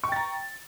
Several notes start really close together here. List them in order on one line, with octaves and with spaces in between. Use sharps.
C#6 G5 A6 A#5